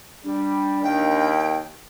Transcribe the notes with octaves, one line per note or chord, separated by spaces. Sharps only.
G3 D4
D#2 G5